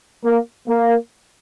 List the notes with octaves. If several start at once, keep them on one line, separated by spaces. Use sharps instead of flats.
A#3
A#3